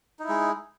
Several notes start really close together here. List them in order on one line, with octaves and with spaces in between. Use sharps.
D#4 E4 G#3